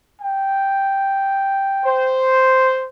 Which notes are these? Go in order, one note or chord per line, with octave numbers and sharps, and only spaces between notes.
G5
C5